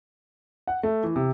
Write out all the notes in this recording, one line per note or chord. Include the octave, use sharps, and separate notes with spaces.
F#5
A3
E3
C3